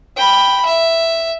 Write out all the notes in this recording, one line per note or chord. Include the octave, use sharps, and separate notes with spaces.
G5 B5
E5